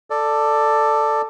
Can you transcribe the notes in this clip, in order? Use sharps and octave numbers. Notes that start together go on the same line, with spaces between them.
A4 D5